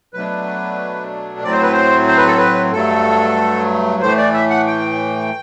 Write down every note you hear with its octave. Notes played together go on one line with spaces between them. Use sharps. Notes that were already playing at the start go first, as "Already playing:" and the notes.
B2 F#3 A3 D4 B4
A2 F#3 C4 D5
C5
B4
C5
C5
B4
A4
B4
G2 F#3 A3 A4
A2 E3 A3 C5
D5
E5
F#5
G5